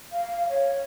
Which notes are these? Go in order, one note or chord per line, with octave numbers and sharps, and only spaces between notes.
F5
C#5